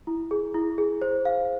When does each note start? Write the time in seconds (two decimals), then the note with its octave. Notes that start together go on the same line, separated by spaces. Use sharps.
0.07 E4
0.31 G#4
0.54 E4
0.78 G#4
1.02 C5
1.25 F5